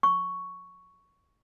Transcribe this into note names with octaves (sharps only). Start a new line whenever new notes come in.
C#6